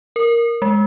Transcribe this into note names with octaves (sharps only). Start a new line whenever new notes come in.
A#4
G#3